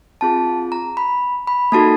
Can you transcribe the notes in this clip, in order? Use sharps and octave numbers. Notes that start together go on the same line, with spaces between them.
C4 F4 G#4 A5
A#5
B5
B5
A#3 D#4 F#4 A4 A5